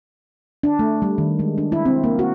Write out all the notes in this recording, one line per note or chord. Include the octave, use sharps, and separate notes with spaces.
D4
A3
G3
D#3
G#3
D4
E4
C4
A#3
F#4